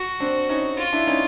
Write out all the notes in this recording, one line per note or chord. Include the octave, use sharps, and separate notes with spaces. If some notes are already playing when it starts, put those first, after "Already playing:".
Already playing: F#4
C4 D4
C#4 D#4
F4
D4 E4
C#4 D#4